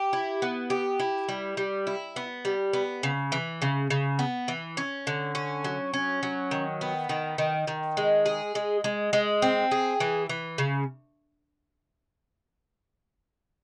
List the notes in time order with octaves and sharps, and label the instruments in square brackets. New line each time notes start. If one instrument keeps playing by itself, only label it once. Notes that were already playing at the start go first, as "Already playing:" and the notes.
Already playing: [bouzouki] G4
E4
B3
G4
E4
G3
G3
E4
B3
G3
B3
C#3
E3
C#3
C#3
B3
E3
C#4
D3
C#4
F#3
C#4
F#3
D#3
B3
D#3
D#3
D#3
G#3
G#4
G#3
G#3
G#3
C4
G#4
E3
E3
C#3